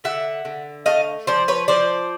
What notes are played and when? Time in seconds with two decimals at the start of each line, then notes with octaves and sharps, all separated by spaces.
0.04 D3 E5 F#5
0.45 D3
0.86 A3 D#5 F5
1.27 F3 C5 D5
1.48 B4 C#5
1.68 F3 C5 D5